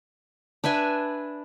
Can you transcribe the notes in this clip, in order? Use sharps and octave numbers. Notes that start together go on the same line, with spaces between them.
D4 B4 E5 G#5